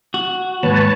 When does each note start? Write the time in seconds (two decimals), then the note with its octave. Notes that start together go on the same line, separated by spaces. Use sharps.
0.14 F#4
0.63 D#2 G#2 B4 C#5 A5